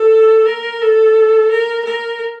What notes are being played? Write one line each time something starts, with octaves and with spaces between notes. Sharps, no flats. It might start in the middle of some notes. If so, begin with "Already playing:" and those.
Already playing: A4
A#4
A4
A#4
A#4